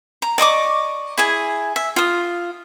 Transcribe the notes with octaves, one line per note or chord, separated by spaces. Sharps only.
A#5
D5 D#5 C#6 D6
E4 G#4 G#5
E5
F4 D#6